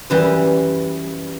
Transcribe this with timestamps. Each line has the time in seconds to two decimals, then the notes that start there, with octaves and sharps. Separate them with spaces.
0.10 F#2 E3 G3